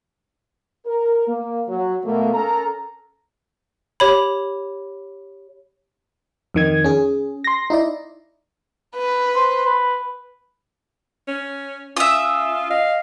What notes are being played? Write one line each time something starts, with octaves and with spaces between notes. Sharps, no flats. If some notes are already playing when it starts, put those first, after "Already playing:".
A#4
A#3
F#3
B2 A3 A#3
C#4 A4 A#4 A5 A#5
G4 C#5 B5
F2 D#3 G#6
C#4 G#4
C6 A#6
D#4 E4 D5
B4
C5
B4
C#4
C#4 F4 E5 D#6
D#5 F5